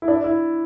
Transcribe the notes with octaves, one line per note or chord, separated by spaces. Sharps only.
E4
D4
E4